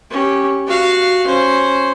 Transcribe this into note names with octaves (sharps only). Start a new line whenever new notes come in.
C#4 G4
F#4 F5
C#4 C5